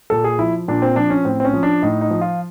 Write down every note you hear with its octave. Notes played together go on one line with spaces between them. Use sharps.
A#2 A4
G#4
F3 E4
A#2 D4
C4
F3 D4
C#4
A2 C4
C4
C#4
F3
D4
A2 D#4
D#4
F3
F4